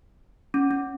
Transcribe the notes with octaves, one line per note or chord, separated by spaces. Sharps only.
C#4
C#4